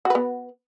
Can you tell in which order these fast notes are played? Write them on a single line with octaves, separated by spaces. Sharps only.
F#4 B4 B3